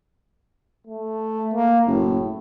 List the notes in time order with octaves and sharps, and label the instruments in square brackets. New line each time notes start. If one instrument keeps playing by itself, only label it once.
[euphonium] A3
A#3
[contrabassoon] F#1 [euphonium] A2